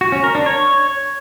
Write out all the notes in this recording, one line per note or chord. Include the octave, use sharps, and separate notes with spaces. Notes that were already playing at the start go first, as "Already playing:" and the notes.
F#4
C#4
A#4
D4
C#5